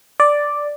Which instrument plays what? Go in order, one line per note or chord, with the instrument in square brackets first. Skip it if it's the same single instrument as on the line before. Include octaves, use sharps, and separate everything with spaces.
[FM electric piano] D5